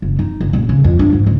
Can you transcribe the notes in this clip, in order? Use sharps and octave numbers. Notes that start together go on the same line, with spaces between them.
F#1
D#4
F#1
D#1
C#3
F2
D4
G#2
C#2